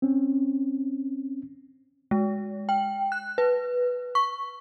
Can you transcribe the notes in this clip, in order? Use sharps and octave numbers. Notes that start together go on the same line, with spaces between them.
C4 C#4
G#3
G5
F#6
B4
C#6